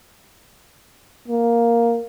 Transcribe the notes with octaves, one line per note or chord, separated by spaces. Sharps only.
A#3